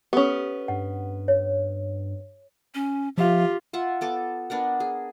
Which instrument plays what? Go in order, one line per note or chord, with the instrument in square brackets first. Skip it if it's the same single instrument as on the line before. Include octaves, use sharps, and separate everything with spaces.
[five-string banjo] B3 C#4 [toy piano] G4 A4
[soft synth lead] G2 [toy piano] F#5
[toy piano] C#5
[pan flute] C#4
[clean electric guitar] F3 E5 F5 [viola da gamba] F4 [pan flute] G4
[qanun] F4 E5 F#5
B3 A4 D6
B3 D4 A#4 F#5
G#4